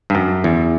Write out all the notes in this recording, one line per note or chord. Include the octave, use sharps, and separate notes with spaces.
G2
F#2
E2